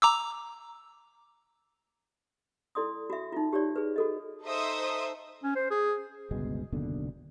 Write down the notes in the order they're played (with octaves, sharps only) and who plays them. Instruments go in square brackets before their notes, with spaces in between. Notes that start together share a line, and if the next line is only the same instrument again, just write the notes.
[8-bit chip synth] A#5 D6 E6
[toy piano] E4 A4 D5 C6 D#6
F#4 E5
D#4 F4
G4 C#5 D5
G#4 B4
F#4 A4 D#5
[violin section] D#4 A4 C5 D#5 E5 D#6
[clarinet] C#4
C5
G#4
[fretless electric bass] G1 C#2 B2 G#3
F#1 D#2 B2 D3